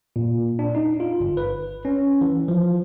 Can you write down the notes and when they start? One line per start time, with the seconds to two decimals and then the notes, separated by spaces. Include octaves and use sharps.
0.16 A#2
0.59 D4
0.75 D#4
1.00 F4
1.20 G1
1.37 B4
1.85 C#4
2.21 E3
2.48 F3